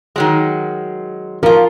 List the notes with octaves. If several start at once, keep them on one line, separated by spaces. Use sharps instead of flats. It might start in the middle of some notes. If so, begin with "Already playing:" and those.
D#3 F#3 G#3
F3 F4 A#4